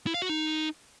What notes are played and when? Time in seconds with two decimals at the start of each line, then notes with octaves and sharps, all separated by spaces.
0.07 E4
0.14 F5
0.22 F#4
0.29 D#4